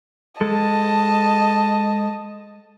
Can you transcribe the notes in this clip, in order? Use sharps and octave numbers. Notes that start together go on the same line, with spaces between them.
G#3 A4 D#5 A5